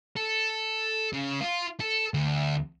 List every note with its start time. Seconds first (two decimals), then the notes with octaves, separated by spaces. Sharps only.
0.17 A4
1.13 C#3
1.41 F4
1.80 A4
2.14 D2